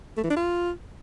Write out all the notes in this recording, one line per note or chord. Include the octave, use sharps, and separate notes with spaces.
A3
E3
D4
F4